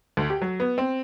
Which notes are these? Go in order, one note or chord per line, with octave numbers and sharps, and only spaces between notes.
D2
G4
F#3
B3
C4